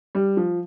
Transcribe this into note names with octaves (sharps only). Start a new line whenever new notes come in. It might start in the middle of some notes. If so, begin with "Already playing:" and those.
G3
F3